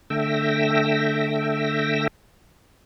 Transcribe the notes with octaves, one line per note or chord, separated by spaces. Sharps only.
D3 A3 E5 G5 E6 A#6